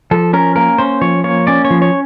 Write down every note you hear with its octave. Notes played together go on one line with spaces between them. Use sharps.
F3 A4
C#4 A#4
A#3 A#4
C#4 C5
F3 C#5
A#3 C#5
C#4 D5
C#5
F3
C#5